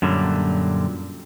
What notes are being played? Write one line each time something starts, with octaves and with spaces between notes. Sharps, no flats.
F#2 A#2 D3 F#3 G3